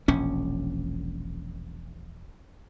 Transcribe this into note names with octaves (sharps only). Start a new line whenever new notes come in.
E1 A#1 C#4